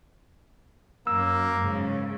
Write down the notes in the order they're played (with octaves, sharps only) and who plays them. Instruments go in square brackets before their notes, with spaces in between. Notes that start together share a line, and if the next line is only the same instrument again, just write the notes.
[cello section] F#2 [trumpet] A#3 [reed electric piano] E6
[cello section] G#2 C#3